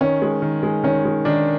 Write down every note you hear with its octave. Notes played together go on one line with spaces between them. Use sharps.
D#3 C#4
G#3
D#3
G#3
D#3 C#4
G#3
D#3 D4